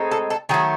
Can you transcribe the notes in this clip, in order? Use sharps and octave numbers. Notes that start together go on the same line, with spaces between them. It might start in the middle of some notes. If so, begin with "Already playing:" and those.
Already playing: A2 G#3 C4 D#4
A4
A4
D#3 F#3 A3 G#4